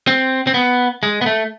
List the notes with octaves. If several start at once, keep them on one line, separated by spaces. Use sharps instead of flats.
C4
C4
B3
G#3
B3
A3